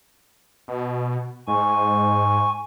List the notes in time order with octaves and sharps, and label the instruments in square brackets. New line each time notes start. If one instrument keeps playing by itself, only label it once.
[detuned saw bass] B2
[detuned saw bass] G#2 [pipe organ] G#5 C#6